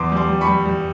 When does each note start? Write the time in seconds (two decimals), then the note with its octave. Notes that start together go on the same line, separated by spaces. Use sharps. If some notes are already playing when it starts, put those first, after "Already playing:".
Already playing: E2 C6 D6
0.12 G3
0.17 C6 D6
0.29 G3
0.41 B5 C#6
0.47 G3
0.66 G3